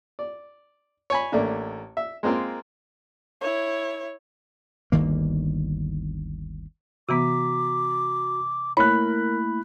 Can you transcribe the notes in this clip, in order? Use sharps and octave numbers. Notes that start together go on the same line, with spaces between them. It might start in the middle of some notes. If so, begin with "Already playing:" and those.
D5
C#5 G#5 B5
A1 A3 A#3 D4
E5
G#3 A#3 C4 F4 A#4
E4 C#5
G1 D2 D#3 A#3
C3 E3 B3 F#4 A#5 D6 B6
A3 A#3 E4 A#4 C#5 B5 F#6